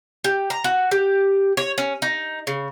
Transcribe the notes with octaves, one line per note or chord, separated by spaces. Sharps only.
G4
A#5
F#4
G4
C#5
C#4
D#4
C#3